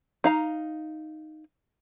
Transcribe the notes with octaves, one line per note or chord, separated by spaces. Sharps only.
D#4 F5 A#5